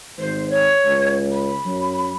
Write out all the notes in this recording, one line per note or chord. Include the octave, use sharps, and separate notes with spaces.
G#1 C5
C#5
C#2
B5
F#2